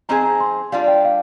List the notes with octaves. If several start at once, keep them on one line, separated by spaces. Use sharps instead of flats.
F3 C4 D#4 G#4 A#5
A#5
C6
G3 D4 F4 F5
G5
F5